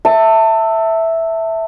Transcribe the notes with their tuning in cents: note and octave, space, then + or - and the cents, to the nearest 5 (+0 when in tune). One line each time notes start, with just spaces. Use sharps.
E5 -5 A5 +25